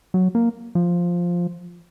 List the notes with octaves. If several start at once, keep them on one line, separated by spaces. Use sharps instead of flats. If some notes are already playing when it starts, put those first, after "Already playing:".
F#3
A#3
F3